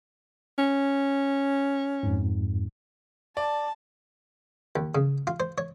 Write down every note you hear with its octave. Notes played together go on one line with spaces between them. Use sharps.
C#4
F2 G#2
D5 A5
D#2
C#3
F4
C5
C#5